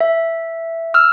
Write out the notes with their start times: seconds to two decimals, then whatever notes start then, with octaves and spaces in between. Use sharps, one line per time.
0.01 E5
0.94 E6 F6